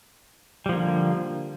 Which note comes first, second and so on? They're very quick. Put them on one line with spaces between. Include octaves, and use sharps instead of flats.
G3 F3 A#3 D3